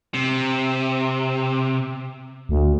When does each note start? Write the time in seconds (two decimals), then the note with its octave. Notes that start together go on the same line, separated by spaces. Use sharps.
0.14 C3
2.49 D2